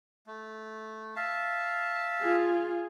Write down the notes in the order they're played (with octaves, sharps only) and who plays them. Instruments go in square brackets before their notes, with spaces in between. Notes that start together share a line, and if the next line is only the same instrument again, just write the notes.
[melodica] A3
E5 F5 A5
[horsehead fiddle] F4 G#4